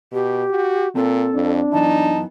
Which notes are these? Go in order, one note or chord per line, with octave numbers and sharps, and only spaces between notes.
B2 G4
F#4
A#2 C4 A4 A5
F2 D4
F#2 E3 B3 D#4 A5